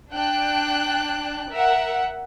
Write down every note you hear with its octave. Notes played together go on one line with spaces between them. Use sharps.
D4 G5 F#6
A#4 E5 F#5